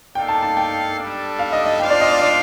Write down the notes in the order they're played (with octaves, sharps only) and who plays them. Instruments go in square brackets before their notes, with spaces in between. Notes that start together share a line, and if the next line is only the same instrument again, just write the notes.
[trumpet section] A#3 D#4 A4 D5 F5 [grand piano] G5
[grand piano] A5
A5
G5
[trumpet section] G3 D4 A4
[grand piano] F5
D#5
D#5
[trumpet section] D4 F4 C5 F5 [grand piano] G5
[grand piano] D5
D#5
D5
D5